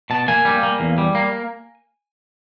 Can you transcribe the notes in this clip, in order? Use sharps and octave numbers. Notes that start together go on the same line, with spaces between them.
B2 A5
A#3 G#5
G3
A#3
E2
G3
A#3